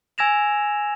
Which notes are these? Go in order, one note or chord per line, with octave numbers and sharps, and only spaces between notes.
G#5 E6 G#6 A#6 E7 F7